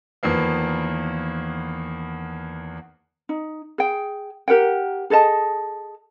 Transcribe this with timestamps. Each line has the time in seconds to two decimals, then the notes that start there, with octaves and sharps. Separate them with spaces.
0.23 E2 D#3 F3 A#3 B3
3.29 D#4
3.78 G#4 G5
4.48 G4 A#4 F#5 G5
5.10 G#4 A4 D#5 A5